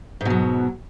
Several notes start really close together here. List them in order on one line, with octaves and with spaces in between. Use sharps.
G#2 B2 F#3